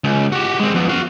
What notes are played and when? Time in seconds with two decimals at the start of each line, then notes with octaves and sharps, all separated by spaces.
0.04 C#2
0.32 F#4 G4
0.60 G#3 C4
0.74 F2 B3
0.89 F#4 F5